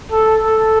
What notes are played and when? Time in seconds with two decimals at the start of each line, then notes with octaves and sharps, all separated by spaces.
0.12 A4
0.46 A4